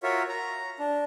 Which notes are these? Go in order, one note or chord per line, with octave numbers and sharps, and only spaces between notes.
F4 F#4 A#4 C#5 E5
A#5
D4